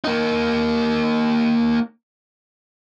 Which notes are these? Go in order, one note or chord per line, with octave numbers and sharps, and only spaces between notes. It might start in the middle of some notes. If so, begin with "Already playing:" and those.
A#3 D#4